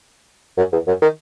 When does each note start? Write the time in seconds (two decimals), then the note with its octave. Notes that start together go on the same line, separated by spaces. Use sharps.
0.57 F#2
0.72 E2
0.87 F#2
1.02 D#3